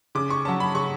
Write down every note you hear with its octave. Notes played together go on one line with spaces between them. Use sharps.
C#3 D6
C#6
F#3 C#4 A5
B5
C#3 C#6